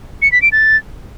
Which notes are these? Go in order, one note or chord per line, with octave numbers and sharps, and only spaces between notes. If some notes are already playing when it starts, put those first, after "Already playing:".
C#7
B6
D7
A6